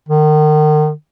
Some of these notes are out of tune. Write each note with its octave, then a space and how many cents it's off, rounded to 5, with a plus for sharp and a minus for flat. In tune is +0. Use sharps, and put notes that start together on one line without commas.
D#3 -35